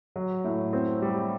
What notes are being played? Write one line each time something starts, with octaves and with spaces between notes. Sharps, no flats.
F#3
A2
C4
G3